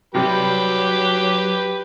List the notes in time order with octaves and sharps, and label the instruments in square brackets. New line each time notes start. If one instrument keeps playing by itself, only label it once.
[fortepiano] C3 G3 [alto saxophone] F#3 [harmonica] G4 B4